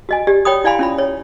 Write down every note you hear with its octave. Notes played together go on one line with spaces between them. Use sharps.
F#4 D#5 G#5
G4 D5
C#5 G5 B5 D#6
E4 D5 F5 G#5 B5 C6
C#4 F4 B5
C#5